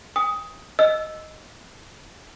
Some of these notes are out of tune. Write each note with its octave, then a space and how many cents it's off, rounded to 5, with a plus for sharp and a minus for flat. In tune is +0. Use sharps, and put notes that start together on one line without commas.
G5 +45 D#6 +15
D#5 +0 E6 +0